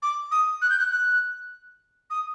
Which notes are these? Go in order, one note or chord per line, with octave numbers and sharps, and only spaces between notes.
D6
D#6
F#6
G6
F#6
F#6
D#6